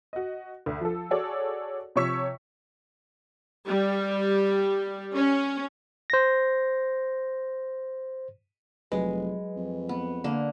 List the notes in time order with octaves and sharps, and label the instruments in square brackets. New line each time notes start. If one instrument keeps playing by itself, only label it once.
[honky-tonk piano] F#4 D#5
D2
F3 A4
F#4 G#4 A4 C#5 D5
C3 F3 C#5 C#6 E6 B6
[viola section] G3
C#4
[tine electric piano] C5 A#6
[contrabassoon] F1 [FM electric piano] F#3 B4 [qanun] G#3
[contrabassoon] F2
[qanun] B3
D3 A#3